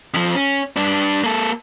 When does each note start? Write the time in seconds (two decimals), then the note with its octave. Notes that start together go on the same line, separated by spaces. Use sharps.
0.14 F2 F3
0.35 C#4
0.76 G2 D4
1.24 A#3 A4